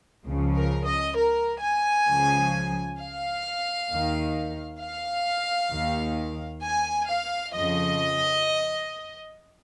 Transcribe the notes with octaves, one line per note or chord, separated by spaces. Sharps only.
C#2 C#3 F3
A#4
D#5
A#4
G#5
C#2 C#3 F3
F5
D#2 D#3
F5
D#2 D#3
G#5
F5
F2 C#3 F3 D#5